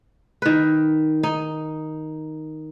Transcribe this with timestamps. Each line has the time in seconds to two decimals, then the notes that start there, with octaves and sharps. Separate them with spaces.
0.42 D#3 B4
1.23 D#4